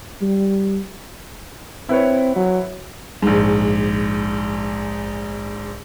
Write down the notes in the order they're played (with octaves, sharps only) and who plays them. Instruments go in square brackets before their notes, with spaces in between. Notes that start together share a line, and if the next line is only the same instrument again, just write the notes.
[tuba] G3
[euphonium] C4 [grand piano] E4 B4 C#5
[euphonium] F#3
[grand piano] A#1 G#2